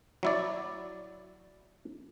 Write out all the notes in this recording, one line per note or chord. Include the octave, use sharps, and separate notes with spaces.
F#3 E4 D5